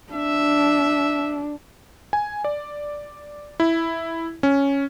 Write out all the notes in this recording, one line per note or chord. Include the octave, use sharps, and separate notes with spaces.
D4 E5
G#5
D5
E4
C#4